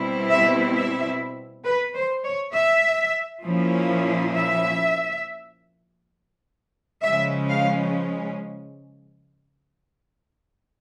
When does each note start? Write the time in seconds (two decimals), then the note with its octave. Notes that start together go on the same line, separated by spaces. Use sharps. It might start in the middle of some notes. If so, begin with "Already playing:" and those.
Already playing: B2 G3 C4 E4
0.30 E5
0.75 E5
1.65 B4
1.95 C5
2.25 C#5
2.54 E5
3.44 A#2 F3 A#3 C#4 E4
4.33 E5
7.03 C#3 F3 G#3 C#4 E5
7.48 F5